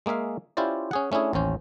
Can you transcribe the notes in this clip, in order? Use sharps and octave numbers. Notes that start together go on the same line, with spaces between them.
G#3 A#3 G#4 E5 F5
C#4 E4 F4 G4 C5 D5
C#4 G#4 F#5
A3 C#4 D4 E4 G#4
A1 D#2 C#4 C5